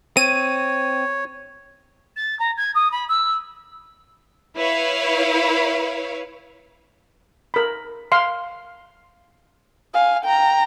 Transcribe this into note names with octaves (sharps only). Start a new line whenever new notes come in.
C4 C#5 D#7
A6
A#5
G#6
D#6
B5
E6
E4 B4 C#5 F5
A#4 B5
F5 C6
F5 G#5
G5 A#5